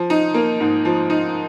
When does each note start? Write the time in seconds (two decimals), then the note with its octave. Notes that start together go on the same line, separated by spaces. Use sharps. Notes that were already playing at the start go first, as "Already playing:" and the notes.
Already playing: F3
0.10 D#4
0.34 A#3
0.60 G#2
0.85 F3
1.10 D#4